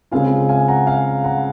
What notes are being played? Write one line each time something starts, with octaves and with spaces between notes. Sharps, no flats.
C#3 G#3 C4 F4 F5 G#5
F5 G#5
F#5 A#5
F5 G#5
F#5 A#5